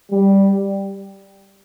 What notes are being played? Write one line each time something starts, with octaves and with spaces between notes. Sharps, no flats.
G3